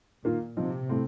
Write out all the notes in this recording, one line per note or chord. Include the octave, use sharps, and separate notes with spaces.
A#2 D#3 A#3 F4
C3 F3 C4 D#4
A2 A3 C4